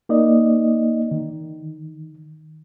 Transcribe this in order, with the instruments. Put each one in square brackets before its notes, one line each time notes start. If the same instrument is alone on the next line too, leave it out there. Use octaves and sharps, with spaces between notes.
[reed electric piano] A#3 D#4 D5 D#5
D#3